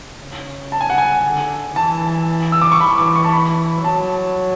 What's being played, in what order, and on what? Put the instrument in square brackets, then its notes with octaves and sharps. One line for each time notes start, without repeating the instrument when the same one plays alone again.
[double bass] C#3
[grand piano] A5
G#5
F#5
G#5
[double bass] D3
[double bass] E3 [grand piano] A5
[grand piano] E6
D6
C#6
[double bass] E3 [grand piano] B5
[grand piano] D6
C#6
A5
B5
[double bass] F#3 [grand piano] A5